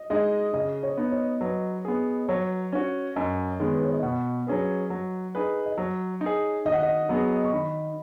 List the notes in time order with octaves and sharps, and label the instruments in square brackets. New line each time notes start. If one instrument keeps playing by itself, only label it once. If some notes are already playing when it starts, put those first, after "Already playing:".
Already playing: [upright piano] D#5
[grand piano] G#3 D#4 [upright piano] D#5
[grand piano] C#3 [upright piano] D#5
[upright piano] C#5
[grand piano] B3 D#4
[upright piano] C#5
[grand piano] F#3 [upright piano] B4
[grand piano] B3 G#4
[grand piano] F#3 [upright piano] C#5
[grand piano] C#4 F#4
[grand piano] F#2 [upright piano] D#5
[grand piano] D#3 G#3 B3
[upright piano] B4
C#5
D#5
[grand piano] B2 [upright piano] F#5
[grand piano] F#3 C#4 G#4 B4
F#3
D#4 G#4 B4
[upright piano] D#5
[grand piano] F#3 [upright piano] C#5
[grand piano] D#4
G#4
[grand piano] D#3 [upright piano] D#5
[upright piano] F#5
D#5
[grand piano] F#3 B3 G#4
[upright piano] C#6
[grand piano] D#3 [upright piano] B5